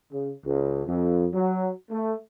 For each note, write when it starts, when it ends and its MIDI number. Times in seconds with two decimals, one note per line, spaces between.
0.12 0.32 49
0.44 0.82 37
0.86 1.26 41
1.33 1.70 54
1.91 2.14 57